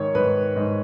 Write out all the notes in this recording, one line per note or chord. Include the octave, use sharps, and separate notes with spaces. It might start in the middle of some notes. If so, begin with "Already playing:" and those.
Already playing: G#2 D#3 C#5
G#2 B4
G#2